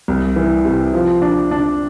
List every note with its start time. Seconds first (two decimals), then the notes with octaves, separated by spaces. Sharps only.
0.08 C2
0.36 E3
0.65 C3
0.94 F3
1.22 D4
1.51 D4